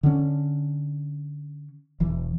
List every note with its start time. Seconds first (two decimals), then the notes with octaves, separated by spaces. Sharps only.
0.03 D3 C#4
2.00 E1 E3